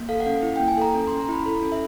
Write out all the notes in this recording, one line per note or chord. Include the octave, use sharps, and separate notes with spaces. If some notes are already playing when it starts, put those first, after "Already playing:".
Already playing: A#3
A4 F5
F#5
C#4 F5
E4
G5
A#3
G#5
A4 A#5
C#4
C6
C#4
A#5
E4 B5
A4
C#4
E5